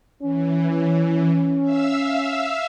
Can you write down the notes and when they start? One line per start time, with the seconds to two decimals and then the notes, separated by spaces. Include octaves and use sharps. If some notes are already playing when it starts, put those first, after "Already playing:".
0.22 E3 C#4
1.61 E5 F5 E6